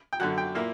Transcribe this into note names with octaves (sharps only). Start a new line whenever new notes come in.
G5
F#2 D3 F#3 F#5
G5
A#2 A#3 E4